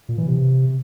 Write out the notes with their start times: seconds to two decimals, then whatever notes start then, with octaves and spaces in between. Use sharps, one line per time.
0.09 A#2
0.18 E3
0.27 C3